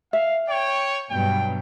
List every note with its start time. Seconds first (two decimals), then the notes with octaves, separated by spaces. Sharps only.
0.13 E5 F5
0.49 C#5 G5
1.11 G2 B2 F#3 G5